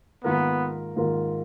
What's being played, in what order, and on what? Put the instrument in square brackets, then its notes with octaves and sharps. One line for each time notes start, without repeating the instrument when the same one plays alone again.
[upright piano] G#2 D#3 A#3 F4 A#4 [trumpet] B3
[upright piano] G#2 D#3 A#3 F4 A#4